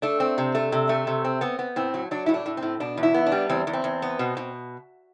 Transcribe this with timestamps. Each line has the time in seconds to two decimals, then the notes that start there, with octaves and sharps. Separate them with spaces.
0.02 A3 D4
0.20 C4
0.38 C3
0.55 A3
0.72 C3
0.89 A3
1.07 C3
1.24 C4
1.41 B3 C4
1.59 B3
1.76 A2 C4
1.94 F#3
2.11 F#3 D4
2.26 A2 E4
2.34 D4
2.46 A2
2.57 C4
2.62 A2
2.80 B2 D4
2.97 E2
3.03 E4
3.14 B3
3.27 D4
3.32 G3
3.49 E2 C4
3.67 E2
3.73 C4
3.84 E2
4.02 B3
4.19 B2
4.37 B2